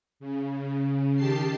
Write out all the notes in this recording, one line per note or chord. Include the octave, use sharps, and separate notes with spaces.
C#3
D#3 G4 A5 C7